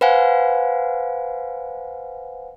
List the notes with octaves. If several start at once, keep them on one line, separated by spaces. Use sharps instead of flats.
B4 C5 F5 F#5 G#5